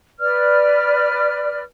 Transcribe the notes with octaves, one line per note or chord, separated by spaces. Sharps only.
B4 D5 F6